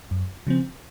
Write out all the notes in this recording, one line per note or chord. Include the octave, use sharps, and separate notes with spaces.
F#2
C#3 F3 C4